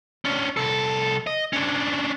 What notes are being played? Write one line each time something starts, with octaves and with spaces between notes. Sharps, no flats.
C#4 D4
C2 A4
D#5
C#4 D4